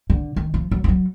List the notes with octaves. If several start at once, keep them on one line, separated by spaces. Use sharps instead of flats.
D3
D#3
F3
F#3
F3
F#3